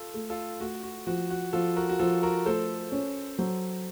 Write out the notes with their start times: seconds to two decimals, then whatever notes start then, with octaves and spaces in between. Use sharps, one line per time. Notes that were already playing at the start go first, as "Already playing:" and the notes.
Already playing: F4 A4
0.14 A3
0.30 F4 A4
0.60 A3 F#4
0.83 F#4
1.07 F3 F#4
1.30 F#4
1.53 F3 F4 A4
1.76 F#4 A#4
1.89 F#4
1.99 F3 F4 A4
2.23 F#4 A#4
2.46 A3 A4 C5
2.92 C#4
3.38 F#3 A4 C5